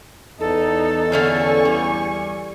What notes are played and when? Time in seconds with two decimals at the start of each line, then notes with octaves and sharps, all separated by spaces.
0.40 E2 D#4 A4
1.12 D3 C#4 F5 G#5 C#6
1.65 G3